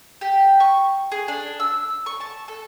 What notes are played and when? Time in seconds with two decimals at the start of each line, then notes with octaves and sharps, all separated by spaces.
0.21 G4
0.60 C#6
1.12 G#4
1.28 D4
1.60 E6
2.06 C#6
2.21 A5
2.48 A4